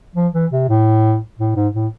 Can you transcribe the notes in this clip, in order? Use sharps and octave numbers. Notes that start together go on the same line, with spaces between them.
F3
E3
C3
A2
A2
G#2
A2